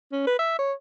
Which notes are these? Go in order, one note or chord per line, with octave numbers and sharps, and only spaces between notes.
C#4
B4
E5
C#5